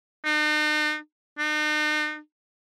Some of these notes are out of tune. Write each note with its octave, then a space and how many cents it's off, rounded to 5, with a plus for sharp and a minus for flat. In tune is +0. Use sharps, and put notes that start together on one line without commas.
D#4 -45
D#4 -45